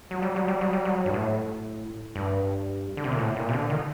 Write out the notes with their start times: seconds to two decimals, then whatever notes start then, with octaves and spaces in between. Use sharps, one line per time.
0.11 F#3
0.22 G3
0.36 F#3
0.48 G3
0.61 F#3
0.73 G3
0.85 F#3
1.06 G2
1.14 A2
2.15 G2
2.97 D3
3.04 C3
3.12 A#2
3.18 A2
3.36 A#2
3.49 C3
3.53 D3
3.70 D#3